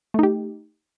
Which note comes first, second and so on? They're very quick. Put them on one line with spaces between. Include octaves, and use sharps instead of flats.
A3 D#4 G4